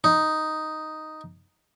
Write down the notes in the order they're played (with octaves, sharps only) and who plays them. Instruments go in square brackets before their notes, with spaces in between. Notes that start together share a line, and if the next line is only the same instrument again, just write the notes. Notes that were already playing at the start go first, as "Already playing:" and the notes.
[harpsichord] D#4